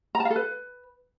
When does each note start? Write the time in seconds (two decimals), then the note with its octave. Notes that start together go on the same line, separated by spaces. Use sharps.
0.15 A#5
0.20 A5
0.25 F5
0.30 A4
0.36 B4